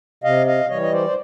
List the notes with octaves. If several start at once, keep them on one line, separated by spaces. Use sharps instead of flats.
C3 D#5 F5
D#5 F5
E3 G3 C#5 D#5
D#5
C5 D5
C5